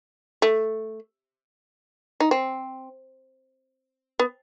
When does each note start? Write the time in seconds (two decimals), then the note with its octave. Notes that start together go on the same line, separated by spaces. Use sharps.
0.42 A3
2.20 D#4
2.31 C4
4.19 B3